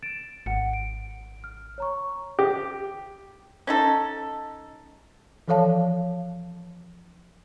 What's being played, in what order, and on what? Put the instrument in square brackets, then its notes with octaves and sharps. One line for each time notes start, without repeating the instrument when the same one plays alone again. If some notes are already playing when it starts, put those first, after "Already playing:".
[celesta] A6 D7 E7
[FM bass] G#1 [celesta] F#5 C#7
[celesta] D7
F6
C#5 A#5 C#6
[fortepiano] G4
[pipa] C#4 D#4 A4
[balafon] E3 F3 A4 C#5 F5 A5